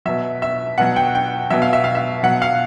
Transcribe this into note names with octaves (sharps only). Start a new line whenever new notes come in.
B2 F#3 E5
E5
B2 F#3 F#5
G5
G5
B2 F#3 E5
F5
E5
F5
E5
B2 F#3 F#5
F5